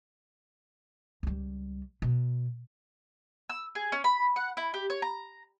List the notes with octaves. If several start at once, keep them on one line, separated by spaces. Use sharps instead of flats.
C#2 G3
B2
E6
G#4
C#4
B5
F#5
E4
G4
C#5
A#5